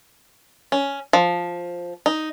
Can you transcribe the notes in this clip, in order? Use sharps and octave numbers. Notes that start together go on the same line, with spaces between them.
C#4
F3
D#4